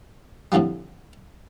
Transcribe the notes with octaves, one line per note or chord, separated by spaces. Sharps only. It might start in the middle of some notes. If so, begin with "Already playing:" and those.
F2 A2 D3 F3 G3